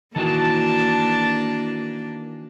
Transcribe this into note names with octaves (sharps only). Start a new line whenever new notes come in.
D#3 E3 A#3 D4 F#4 A5